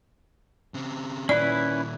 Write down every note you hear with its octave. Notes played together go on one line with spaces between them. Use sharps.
C#3 C4
A#2 D#3 C#4 E4 B4 D5